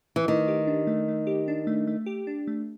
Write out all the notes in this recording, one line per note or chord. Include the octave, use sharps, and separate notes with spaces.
E3
D#3 A3
G4
D4
A3
A3
G4
D4
A3
A3
G4
D4
A3